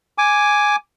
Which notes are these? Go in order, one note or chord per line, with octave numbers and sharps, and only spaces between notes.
G#5 D6